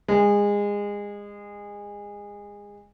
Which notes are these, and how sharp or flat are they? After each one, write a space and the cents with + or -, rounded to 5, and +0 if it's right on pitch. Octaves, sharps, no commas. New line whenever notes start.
G#3 -25